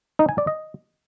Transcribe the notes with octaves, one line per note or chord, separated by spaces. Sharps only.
D#4
G#5
D5
D#5